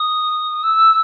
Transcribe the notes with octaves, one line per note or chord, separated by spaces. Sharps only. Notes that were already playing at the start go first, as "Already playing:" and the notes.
Already playing: D#6
E6